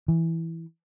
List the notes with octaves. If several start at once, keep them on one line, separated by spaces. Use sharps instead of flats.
E3